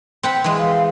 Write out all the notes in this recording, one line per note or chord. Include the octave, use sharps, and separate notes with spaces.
C4 F#5 B5
E3 G#3
F5